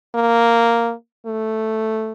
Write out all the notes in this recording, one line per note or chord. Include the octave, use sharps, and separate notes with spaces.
A#3
A3